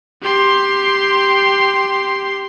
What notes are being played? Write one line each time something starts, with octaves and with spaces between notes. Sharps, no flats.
G4 C6